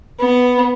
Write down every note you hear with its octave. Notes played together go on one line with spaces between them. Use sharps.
B3